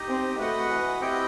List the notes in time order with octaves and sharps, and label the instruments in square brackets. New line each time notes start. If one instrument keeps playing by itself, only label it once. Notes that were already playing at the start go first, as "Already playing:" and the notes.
Already playing: [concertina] D#4 G4 D#5
[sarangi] C4
[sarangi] A3 [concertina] F#4 B4 D#5 F#5
[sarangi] E3
[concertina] C4 E4 G4 D#5 G5